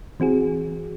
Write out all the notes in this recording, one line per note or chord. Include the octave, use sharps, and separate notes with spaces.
E3 C4 F#4 G#4